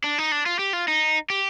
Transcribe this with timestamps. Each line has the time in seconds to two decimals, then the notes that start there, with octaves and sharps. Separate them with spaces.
0.04 D4
0.18 D#4
0.32 D4
0.46 F4
0.59 G4
0.73 F4
0.88 D#4
1.30 G4